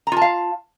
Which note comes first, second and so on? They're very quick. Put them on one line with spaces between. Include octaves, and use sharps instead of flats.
A#5 F4 A5 F5